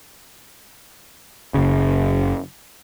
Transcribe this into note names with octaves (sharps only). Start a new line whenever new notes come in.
F#1 C#3